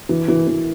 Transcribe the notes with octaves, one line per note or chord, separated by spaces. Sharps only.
E3
E3
E3